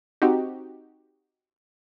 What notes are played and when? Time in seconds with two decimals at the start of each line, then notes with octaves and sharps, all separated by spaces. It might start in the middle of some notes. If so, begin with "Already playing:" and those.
0.22 C4 D#4 F#4 G4